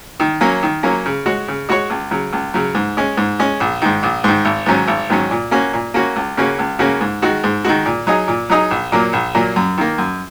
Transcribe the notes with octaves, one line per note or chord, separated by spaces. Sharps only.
D#3
F#3 A#3 C#4
D#3
F#3 A#3 C#4
C#3
G#3 F#4 C#5
C#3
G#3 F#4 C#5
C#2
C#3 F#3
C#2
C#3 F#3
G#2
G#3 C#4
G#2
G#3 C#4
A#1
G#2 D#3
A#1
G#2 D#3
G#1
G#2 D#3 F#3 C#4
G#1
G#2 D#3 F#3 C#4
A#2
A#3 C#4 F#4
A#2
A#3 C#4 F#4
C#2
C#3 A#3 C#4 F#4
C#2
C#3 A#3 C#4 F#4
G#2
D#3 G#3 F#4
G#2
D#3 G#3 F#4
A#2
F#3 D#4 G#4 D#5
A#2
F#3 D#4 G#4 D#5
A#1
A#2 F#3 A#3
A#1
A#2 F#3 A#3
F#2
D#3 A#3
F#2